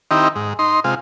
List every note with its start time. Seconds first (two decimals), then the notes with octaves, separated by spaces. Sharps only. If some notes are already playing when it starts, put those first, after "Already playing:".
0.11 D#3 C4 D#4 E4 G4
0.35 G#2
0.59 D#4 C6
0.84 C3 G#3 F4